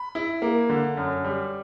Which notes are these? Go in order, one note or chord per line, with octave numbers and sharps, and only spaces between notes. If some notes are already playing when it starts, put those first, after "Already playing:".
Already playing: B5
E4
A#3
D3
F#2
G3